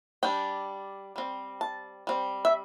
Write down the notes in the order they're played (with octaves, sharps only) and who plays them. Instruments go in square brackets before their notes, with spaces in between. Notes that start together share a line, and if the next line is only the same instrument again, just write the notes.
[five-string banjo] G3 D4 G5
G3 C4
A5
G3 C4
E5